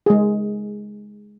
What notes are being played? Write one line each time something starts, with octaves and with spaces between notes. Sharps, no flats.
G#3 G#4